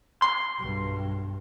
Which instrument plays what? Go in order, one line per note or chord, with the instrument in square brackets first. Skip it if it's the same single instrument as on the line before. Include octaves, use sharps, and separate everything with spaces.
[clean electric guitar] C6
[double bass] B1 G2